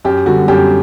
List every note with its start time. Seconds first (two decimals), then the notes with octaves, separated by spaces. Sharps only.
0.05 F#2 G4
0.26 D3 G3 F#4
0.48 F#2 G4